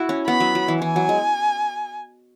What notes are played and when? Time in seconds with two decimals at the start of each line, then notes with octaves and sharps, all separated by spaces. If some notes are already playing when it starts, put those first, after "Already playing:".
Already playing: E4 F#4
0.09 C#4
0.27 B3 B5
0.40 F#3
0.55 F#3
0.68 E3
0.82 E3 G#5
0.96 F#3
1.09 G#3